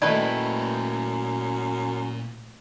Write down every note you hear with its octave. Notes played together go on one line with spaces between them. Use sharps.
F#2 A#2 A3 E4 B4 D5 D#5 G5